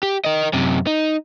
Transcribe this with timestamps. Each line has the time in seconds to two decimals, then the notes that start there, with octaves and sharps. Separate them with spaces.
0.03 G4
0.25 A#4 D#5
0.53 F#2 C3
0.87 D#4